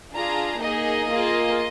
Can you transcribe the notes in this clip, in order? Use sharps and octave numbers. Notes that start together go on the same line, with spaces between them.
D4 F4 G#4 A#5
A#3 D#4 G#4 D#5
A#3 F4 G#4